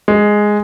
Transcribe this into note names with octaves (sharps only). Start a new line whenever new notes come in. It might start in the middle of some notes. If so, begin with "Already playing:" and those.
G#3